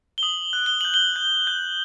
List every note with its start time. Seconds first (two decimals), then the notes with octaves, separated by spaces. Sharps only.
0.18 G7
0.23 D#6 F#7
0.53 F#6
0.66 G7
0.81 G6 F#7
0.94 G7
1.16 G6
1.47 G6